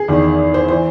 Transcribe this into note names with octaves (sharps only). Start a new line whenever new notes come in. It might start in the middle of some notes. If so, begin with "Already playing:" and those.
Already playing: G#4
E2 D#3
C5
E3 C5